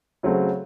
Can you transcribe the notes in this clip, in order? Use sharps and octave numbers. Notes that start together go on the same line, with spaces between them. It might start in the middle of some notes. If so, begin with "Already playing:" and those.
C#3 F#3 A3 C4